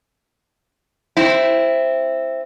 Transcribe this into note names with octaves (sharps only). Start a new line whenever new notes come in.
C4 E4